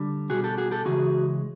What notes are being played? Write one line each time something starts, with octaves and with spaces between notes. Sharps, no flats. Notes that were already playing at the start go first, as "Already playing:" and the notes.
Already playing: D3 G3
B2 G3 F#4 G#4
G4 A4
F#4 G#4
G4 A4
C#3 E3 G#3 F#4 G#4